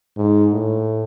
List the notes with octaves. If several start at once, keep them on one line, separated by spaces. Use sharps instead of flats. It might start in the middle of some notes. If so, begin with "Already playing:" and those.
G#2
A2